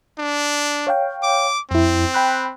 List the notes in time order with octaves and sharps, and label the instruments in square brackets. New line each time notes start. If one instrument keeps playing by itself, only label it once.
[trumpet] D4
[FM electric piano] C#5 F5 G5
[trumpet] D6
[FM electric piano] F2 E4 [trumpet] C4
[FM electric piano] G5 B5 F#6